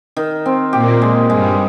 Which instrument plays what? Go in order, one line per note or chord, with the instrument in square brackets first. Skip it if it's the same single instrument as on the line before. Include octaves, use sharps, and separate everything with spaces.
[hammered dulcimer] D#3
C4
[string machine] A#2 A#3 [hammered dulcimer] G4
[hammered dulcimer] G#3
[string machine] G2 G3 [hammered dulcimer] G#3